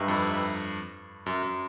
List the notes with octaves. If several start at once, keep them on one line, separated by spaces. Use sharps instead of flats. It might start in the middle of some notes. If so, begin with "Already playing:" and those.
Already playing: G2 D#4 G4 B4 E5
F2
F#2
F#2